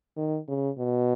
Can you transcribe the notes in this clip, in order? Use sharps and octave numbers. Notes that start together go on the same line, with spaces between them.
D#3
C#3
B2